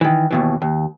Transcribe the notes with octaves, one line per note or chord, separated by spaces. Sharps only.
D#3 E3
D#2 B2 E3
D#2